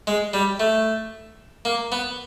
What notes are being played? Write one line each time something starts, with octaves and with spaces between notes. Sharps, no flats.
G#3
G3
A3
A#3
B3